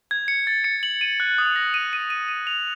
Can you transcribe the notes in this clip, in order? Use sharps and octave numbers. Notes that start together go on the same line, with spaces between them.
G#6
C#7
A6
C#7
F#7
D#7
F#6
D#6
A#6
D#7
D#7
D#7
D#7
F7